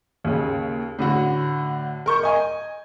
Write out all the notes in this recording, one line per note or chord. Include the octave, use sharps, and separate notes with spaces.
D#2 C#3
A2 D3 F#4
A#4 C#6 G6
D#5 G#5